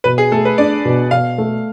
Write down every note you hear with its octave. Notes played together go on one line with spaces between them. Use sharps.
B2 B4
G#4
A3 A4
B4
D4 D5
B2
B2 F5
A3